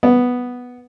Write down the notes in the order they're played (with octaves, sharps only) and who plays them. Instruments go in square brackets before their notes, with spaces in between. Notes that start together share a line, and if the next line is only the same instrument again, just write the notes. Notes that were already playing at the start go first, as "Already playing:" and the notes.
[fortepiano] B3